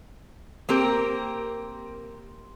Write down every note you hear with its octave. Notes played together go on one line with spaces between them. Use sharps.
A#3 C4 G4 A#4